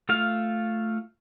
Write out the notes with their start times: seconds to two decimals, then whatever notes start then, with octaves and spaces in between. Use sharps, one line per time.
0.09 A3 F4 F5